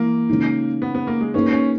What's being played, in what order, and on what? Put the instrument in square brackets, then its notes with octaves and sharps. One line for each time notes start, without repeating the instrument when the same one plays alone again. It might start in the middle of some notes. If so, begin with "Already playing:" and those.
Already playing: [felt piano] E3 G#3 [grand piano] A#3
[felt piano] C#3 G#3 D#4
[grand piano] B3
B3
A#3
G#3
[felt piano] A#3 D#4 G#4 B4 [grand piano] C#4
[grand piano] C#4